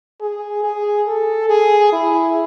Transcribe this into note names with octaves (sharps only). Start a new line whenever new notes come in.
G#4
G#4
A4
G#4
E4